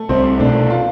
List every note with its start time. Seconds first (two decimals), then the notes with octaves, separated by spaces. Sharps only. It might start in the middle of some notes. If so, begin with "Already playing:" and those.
Already playing: A3
0.09 C2 C4
0.40 B2 A3 D4
0.70 F4